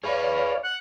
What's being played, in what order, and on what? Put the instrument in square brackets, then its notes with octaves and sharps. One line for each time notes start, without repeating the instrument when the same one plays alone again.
[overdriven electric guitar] G#4 B4 [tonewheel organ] C#5 D5 F5
[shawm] F#5